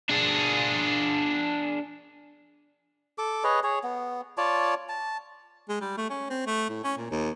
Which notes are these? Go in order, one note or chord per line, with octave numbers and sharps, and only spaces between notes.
D4 G#4
A4 D6
G#4 B4 C#5 D#5
G#4 C#5
B3
F4 C#5 D5 A5
A5
G#3
G3
A3
C#4
C4
A3
A2
C#4
A#2
D#2